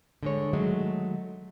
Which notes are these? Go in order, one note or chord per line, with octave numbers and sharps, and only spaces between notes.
D3 G#3 C#5
D#3 F#3 G#3 A3